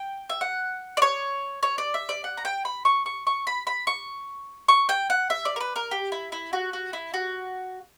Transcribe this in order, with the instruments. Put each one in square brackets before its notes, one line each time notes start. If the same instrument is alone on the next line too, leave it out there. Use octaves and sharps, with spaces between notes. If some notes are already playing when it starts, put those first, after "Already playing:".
Already playing: [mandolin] G5
E5
F#5
D5
C#5
C#5
D5
E5
D5
F#5
A#5
G5
B5
C#6
C#6
C#6
B5
B5
C#6
C#6
G5
F#5
E5
D5
A#4
B4
A#4
G4
E4
E4
F#4
F#4
E4
F#4